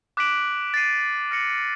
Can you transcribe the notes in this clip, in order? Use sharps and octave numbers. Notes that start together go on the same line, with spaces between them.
D6 F#6 B6 D7 F#7
A6 C7 D#7
F6 A#6 C#7 F#7